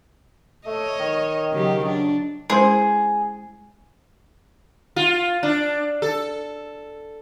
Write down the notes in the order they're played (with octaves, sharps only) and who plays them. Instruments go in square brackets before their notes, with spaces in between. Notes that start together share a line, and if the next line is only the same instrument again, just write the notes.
[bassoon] A3 [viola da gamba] C#5 D#5
[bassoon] D#3
[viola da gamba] C#3 F#3 G4
D4
[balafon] G#3 C#4 [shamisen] E4 C5 [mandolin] G#4
[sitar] F4
D4
A4